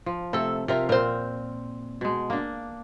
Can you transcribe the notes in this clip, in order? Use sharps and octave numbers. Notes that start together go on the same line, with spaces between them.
F3
C3 A3 A4
C3 F4 A#4 E5
A#2 C4 A#4 C5
B2 G#3
A#3 D4